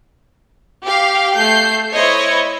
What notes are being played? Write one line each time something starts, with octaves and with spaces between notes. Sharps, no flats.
G4 F5
A3 G6 C7
E4 C5 C#5 D#5